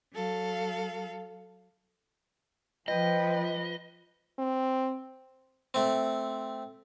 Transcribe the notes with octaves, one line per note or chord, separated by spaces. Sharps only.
F#3 A4 F5
F3 B4 D#5 G5
C4
A3 C4